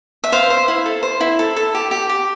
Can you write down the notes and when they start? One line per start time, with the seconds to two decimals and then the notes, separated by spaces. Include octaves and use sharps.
0.24 E5
0.32 C5 F5
0.50 C5
0.68 E4
0.86 A4
1.03 C5
1.21 E4
1.39 A4
1.56 A4
1.75 G4
1.91 G4
2.09 G4